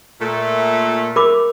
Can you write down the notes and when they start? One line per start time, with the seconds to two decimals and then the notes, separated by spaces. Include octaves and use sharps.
0.20 A#2 A3
1.16 A#4 B5 D6